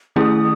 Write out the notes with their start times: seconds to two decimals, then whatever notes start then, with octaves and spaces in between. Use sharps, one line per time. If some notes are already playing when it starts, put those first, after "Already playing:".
0.16 D#3 A3 C#4 E4 G#4 D#6